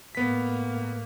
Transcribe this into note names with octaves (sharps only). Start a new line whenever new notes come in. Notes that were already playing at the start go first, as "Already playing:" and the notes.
A2 A#3 B3 B6